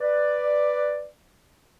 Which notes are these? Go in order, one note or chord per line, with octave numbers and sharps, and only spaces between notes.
B4 D5